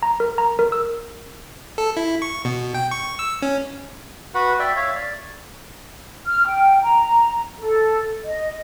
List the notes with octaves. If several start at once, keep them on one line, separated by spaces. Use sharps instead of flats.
A#5
A#4
A#5
A#4
E6
A4
E4
C#6
B2
G5
C#6
E6
C#4
F#4 B4 F#5
D5 E5 G5
C#5 E5 F5
D5
F6
G5
A#5
A4
D#5